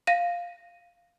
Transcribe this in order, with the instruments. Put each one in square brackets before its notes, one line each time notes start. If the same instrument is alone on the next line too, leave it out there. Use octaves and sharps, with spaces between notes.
[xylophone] F5 A#6 D#7